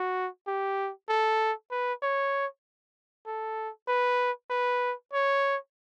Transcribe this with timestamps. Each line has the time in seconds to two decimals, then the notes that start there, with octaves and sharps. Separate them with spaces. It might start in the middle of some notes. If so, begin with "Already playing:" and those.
Already playing: F#4
0.47 G4
1.09 A4
1.71 B4
2.03 C#5
3.26 A4
3.88 B4
4.50 B4
5.13 C#5